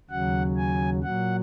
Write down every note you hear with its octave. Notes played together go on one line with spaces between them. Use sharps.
D#2 C#3 F#3 F#5
G#5
A#2 F#3 F#5